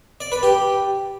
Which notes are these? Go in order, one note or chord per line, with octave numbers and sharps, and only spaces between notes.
D5
B4
G4